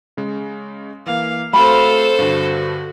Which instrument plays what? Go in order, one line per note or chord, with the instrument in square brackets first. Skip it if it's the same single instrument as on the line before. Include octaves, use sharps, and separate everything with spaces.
[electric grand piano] C#3 G#3
[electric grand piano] E3 A#3 [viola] F5
[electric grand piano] A3 F#4 [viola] C4 F5 [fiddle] A4 C5 [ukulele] B5
[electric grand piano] G2 D3 [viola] F#4